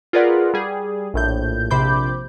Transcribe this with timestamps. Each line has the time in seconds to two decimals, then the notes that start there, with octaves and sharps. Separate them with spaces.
0.13 F4 G#4 A#4 B4 D5 F#5
0.54 G3 G#4
1.14 A#1 A2 G6
1.71 A#1 C3 C5 B5 D6 G6